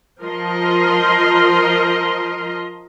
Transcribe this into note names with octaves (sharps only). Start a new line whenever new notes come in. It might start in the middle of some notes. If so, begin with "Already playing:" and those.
F3 A#4 D#5 C6